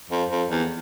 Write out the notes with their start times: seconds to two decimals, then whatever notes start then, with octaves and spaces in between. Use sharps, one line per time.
0.10 F2
0.30 F2
0.49 E2